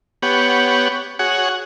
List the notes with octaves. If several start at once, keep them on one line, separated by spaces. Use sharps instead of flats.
B3 G4 C#5 F#5
F#4 G#4 C#5 F#5